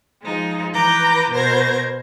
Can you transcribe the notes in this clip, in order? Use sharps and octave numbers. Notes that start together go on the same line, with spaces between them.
F3 G#3 D#4
E3 B4 A#5 D6 G6
B2 A#4 C5 G#6 A#6